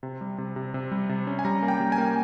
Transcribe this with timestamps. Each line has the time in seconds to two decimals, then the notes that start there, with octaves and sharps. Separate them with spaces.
0.03 C3
0.21 G3
0.38 C3
0.56 C3
0.74 C3
0.92 G3
1.09 C3
1.27 C#4
1.39 G#5
1.45 G3 A#5
1.62 A#3
1.68 G5
1.80 G3
1.92 G#5
1.98 A#3